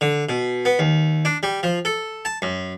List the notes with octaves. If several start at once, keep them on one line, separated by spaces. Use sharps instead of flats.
D3
B2
B3
D#2
D4
G3
F3
A4
A5
F#2